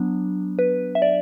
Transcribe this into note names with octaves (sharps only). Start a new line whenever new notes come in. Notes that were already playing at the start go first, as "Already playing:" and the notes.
Already playing: F#3 B3 D4
B4
E5
D5